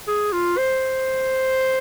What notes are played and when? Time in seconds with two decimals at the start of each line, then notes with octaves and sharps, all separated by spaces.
0.07 G#4
0.33 F4
0.58 C5